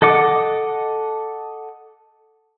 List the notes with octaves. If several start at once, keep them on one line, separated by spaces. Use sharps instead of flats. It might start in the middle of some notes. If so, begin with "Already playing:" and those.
A4 D#5 F#5 D6